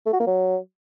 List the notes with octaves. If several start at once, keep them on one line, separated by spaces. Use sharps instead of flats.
A3
F#4
A#3
F#3